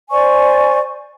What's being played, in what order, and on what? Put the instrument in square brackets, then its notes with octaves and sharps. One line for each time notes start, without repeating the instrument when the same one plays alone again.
[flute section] C5 D5 G#5 C#6